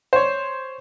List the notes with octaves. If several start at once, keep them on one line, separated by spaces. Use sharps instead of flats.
C5 C#5